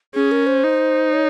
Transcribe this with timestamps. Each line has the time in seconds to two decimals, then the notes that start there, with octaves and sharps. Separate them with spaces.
0.15 C#4 G#4
0.32 A#4
0.47 C5
0.64 D#4
1.13 C#5